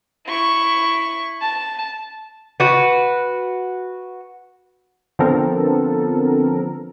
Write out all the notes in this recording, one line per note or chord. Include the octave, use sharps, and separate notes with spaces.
E4 C#6
A5
F#4 B4
D3 F3 B3 C4 A4 A#4